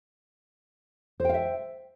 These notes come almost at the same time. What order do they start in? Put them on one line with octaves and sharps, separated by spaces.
C5 G5 F5 E5